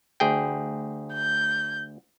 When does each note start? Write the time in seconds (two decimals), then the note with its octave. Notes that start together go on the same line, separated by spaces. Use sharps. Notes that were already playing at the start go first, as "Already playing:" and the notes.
0.20 D2 G#4 G5
1.14 G6